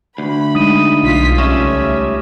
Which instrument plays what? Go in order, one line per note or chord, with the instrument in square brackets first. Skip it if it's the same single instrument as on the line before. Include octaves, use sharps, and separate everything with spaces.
[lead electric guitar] D2 [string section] B5
[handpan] G#3 D#4 [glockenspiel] D#6 D#7
[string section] B1 F4 B6
[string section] C#2 A3 E5 [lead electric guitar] G3 C#4 [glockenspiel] C#6 A#6 E7